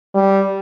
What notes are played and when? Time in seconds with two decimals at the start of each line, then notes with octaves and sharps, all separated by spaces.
0.15 G3